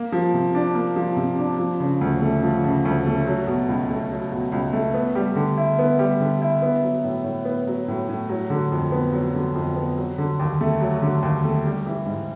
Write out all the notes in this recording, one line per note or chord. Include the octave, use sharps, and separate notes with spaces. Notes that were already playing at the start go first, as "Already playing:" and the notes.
Already playing: A#3
F3
C3
D4
A#3
F3
C3
D4
F3
C#3
D2
A3
F3
C#3
D2
A3
F#3
B2
C#2
A3
F#3
B2
C#2
A3
B3
G3
D3
E4
B3
G3
D3
E4
B3
F#3
A2
A2
B3
F#3
A2
A2
F#3
D3
F2
B3
F#3
D3
F2
B3
F#3
D3
D#2
A3
F#3
D3
D#2
A3
G3
E3
G#2